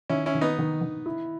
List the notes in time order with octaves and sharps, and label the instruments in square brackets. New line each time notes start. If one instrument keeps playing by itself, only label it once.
[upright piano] D#3 [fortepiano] C#4 E4
[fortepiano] C#4 E4
[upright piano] D#3
[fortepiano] B3 D#4
[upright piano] D#3
D#3
E4